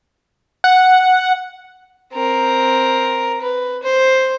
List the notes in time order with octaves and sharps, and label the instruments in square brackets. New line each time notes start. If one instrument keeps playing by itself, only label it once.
[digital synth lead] F#5
[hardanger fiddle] C4 A#4
B4
C5